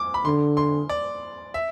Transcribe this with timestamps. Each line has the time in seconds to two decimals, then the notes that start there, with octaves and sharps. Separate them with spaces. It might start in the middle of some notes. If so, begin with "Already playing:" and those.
Already playing: D6
0.14 B5
0.25 D3 C6
0.57 C6
0.89 D5
1.54 E5